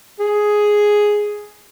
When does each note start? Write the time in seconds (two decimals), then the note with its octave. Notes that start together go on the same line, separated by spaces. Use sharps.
0.20 G#4